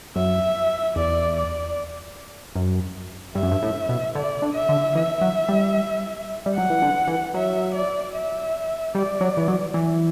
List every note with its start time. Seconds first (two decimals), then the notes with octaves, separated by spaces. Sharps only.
0.16 F#2 E5
0.96 E2 D5
1.36 D5
2.56 F#2
3.35 G2 E5
3.43 F#2
3.52 G2
3.63 A2
3.89 B2
4.15 D3 D5
4.42 D3
4.55 E5
4.69 D3
4.95 E3 E5
5.21 F#3
5.49 G3
6.46 G3
6.55 F#3 F#5
6.70 E3
6.82 D3
7.08 E3
7.34 F#3 E5
7.75 D5
8.14 E5
8.94 G3 D5
9.21 F#3
9.37 E3
9.48 F#3
9.74 E3